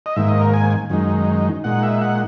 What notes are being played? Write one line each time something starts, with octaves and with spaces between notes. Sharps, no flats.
D#5
G#2 D#3 A#3 E5
D#5
A#4
G#5
F#2 D#3 G#3 D#4
A#2 G#3 D#4 F#5
E5
F#5